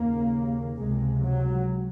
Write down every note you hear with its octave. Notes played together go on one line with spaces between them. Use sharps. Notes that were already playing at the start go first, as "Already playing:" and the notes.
Already playing: D#2 C#3 A#3
C#2 C3 G#3
F#3